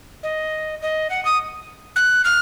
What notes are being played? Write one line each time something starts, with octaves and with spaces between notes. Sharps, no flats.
D#5
D#5
F#5
D#6
F#6
F6